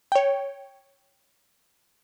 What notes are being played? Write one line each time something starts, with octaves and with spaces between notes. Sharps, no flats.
C#5 G5